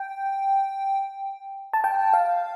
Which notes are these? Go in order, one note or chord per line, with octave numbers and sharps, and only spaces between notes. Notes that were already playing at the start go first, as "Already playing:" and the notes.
Already playing: G5
A5
G5
F5